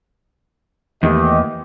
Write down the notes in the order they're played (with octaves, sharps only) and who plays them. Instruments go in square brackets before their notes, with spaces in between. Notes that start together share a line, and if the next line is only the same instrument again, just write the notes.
[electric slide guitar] E2 [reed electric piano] D#3 A3 A#3 [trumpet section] G4 D#5